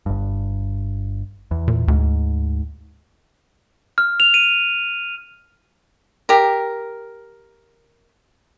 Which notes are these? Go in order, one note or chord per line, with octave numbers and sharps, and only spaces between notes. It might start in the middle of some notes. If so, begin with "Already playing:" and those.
G1 G2
E2
A#2
D2 G#2
F6
F7
D#7
G4 A#4